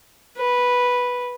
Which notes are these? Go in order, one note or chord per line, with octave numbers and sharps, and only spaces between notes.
B4